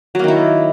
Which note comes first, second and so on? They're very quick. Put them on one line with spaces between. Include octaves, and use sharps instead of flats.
F#3 A#3 D#3 E4